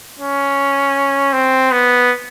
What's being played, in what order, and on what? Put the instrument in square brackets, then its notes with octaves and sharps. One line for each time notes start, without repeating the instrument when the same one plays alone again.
[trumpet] C#4
C4
B3